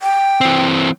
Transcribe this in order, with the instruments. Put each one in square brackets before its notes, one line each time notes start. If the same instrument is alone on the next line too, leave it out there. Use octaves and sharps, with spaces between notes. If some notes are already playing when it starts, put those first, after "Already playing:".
[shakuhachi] G5
[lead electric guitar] E3 C4